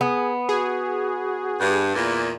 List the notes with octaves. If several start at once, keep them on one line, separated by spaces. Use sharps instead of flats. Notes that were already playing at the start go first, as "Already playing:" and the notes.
B3 G#4
F#4 G#4
G2
E2 A#2